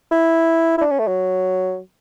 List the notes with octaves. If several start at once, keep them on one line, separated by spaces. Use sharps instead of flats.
E4
E4
D4
C#4
A3
F#3